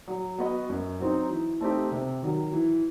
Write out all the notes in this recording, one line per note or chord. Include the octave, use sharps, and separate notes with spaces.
F#3
B3 F#4 B4 D#5
F#2
F#3 C4 D#4
E3
A3 C4 D#4 G4
C3
D#3 F#3
E3